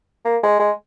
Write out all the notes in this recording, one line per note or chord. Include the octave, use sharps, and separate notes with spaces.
A#3
G#3
G#3